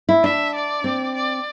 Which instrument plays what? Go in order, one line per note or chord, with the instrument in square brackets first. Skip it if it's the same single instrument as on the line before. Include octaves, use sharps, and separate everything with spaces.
[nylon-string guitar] E4
[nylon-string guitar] D4 [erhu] E5
[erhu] D5
[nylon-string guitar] C4
[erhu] D5